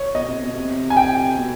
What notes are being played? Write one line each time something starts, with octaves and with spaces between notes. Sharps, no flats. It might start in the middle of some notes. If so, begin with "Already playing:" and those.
Already playing: C#5
B2 D#5
C3
B2
C3
G#5
G5
B2